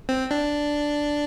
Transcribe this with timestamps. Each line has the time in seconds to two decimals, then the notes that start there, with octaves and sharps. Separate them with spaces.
0.09 C4
0.31 D4